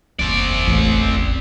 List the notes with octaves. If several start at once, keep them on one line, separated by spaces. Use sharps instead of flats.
F#1 E2 C4 D5
A1